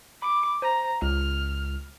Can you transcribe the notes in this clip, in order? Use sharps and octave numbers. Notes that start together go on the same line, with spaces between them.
B5 D6
C5 A#5
C#2 F6